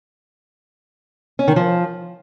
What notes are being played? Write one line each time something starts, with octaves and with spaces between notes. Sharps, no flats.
C#4
D#3
F3